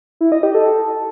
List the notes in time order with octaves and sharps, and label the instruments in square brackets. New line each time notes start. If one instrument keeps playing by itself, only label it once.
[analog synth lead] E4
D#5
G4
A4